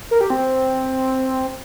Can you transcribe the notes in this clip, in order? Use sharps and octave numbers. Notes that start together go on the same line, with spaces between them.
A#4
G4
C4